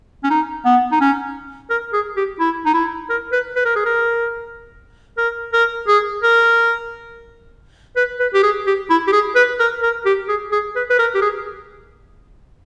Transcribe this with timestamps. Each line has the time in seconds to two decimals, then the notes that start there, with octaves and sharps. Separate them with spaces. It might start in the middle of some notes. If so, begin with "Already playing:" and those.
0.24 C#4
0.30 D#4
0.65 B3
0.92 D#4
1.01 C#4
1.70 A#4
1.93 G#4
2.17 G4
2.40 E4
2.66 D#4
2.74 E4
3.10 A#4
3.32 B4
3.56 B4
3.65 A#4
3.76 G#4
3.86 A#4
5.18 A#4
5.53 A#4
5.88 G#4
6.23 A#4
7.96 B4
8.20 B4
8.34 G4
8.43 G#4
8.67 G4
8.90 E4
9.07 G4
9.13 G#4
9.36 B4
9.60 A#4
9.83 A#4
10.06 G4
10.29 G#4
10.52 G#4
10.76 B4
10.90 B4
10.99 A#4
11.15 G4
11.22 G#4